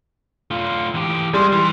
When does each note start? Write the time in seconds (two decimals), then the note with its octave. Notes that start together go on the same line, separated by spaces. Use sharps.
0.51 A3 F4
0.95 E3 G4
1.34 G3 G#3 C6
1.52 E3 C6